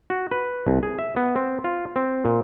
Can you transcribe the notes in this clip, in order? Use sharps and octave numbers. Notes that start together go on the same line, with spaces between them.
F#4
B4
C2
G#4
E5
B3
C4
F4
C4
A#2